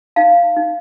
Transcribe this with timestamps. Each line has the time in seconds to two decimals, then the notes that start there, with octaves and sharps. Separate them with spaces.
0.16 D#4 F5 A5
0.56 D#4